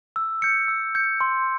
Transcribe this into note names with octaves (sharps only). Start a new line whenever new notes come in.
E6
G6 C#7
E6
G6 C#7
C6